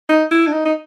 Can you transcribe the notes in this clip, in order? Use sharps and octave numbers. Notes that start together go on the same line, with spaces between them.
D#4
E4
D4
D#4
D#4